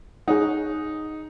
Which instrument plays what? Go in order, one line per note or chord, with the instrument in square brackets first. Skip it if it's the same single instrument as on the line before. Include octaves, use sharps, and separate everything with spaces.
[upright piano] D#4 [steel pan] G#4 C#5 F#5